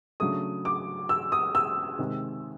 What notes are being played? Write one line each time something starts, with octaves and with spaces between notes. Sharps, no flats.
C#3 F#3 A3 D4 D#6
D6
E6
D#6
E6
C3 D#3 G#3 C4